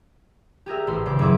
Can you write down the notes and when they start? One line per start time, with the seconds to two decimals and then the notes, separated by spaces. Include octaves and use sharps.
0.66 G4 G#4 A#4 E5
0.87 A1 E4 A4 C5 B5 C6
1.06 D#1 C#3 C5 D6 B6
1.19 F#1 C#4 G#4 B4 E5 D6